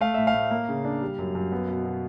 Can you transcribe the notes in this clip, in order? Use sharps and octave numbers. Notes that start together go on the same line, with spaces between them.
A3 F5
A2 E5
F5
A2
A#3
C#3
D4
G3
F#2
F#2
B3
B2
B2